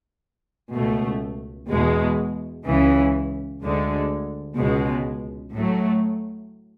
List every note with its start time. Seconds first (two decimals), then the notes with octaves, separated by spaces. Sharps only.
0.74 C#2 B2 A3
1.70 E2 B2 G#3
2.66 C#2 C#3 E3
3.62 D2 D3 G#3
4.58 C#2 B2 G#3
5.54 A2 F#3 A3